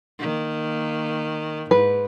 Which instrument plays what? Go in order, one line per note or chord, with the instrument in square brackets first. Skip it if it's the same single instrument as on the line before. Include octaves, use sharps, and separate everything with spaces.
[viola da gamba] D#3 A#3
[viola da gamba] G#2 [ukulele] B4